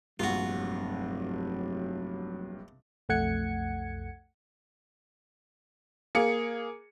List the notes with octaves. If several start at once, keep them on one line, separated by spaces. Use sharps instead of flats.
F1 A#1 G2 F#3 F4 F#4
B1 F2 A3 F#5 G#6 C#7
A#3 G#4 C#7